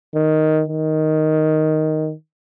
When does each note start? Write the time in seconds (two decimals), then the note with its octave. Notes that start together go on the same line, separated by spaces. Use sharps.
0.15 D#3
0.68 D#3